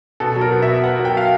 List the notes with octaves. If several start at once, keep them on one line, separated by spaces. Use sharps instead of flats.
B2 A4
F#3
A#4
B2
E5
B3
B3 F#5
F#3
G5
F5